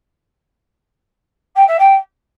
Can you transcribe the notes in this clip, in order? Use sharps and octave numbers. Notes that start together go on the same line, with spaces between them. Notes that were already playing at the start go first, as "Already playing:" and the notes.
G5
E5
G5